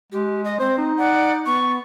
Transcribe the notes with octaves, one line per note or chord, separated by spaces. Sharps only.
G#3 G4
D#5
C4 C5
D#4
D5 F#5
B3 C#6